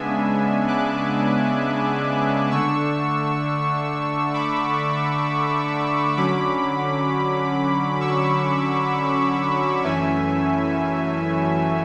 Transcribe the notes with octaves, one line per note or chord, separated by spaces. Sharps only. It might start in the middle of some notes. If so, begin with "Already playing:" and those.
Already playing: C#3 G#3 B3 D4 E5 G#5
D6 F#6
D3 A3 D4 C#6 E6
B5 D6
D3 F#3 C#4 B5 D6
C#6 E6
F#2 E3 A3 C#4 E5 G#5